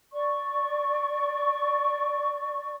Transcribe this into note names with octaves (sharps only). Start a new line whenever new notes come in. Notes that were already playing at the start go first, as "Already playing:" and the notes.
D5 C#6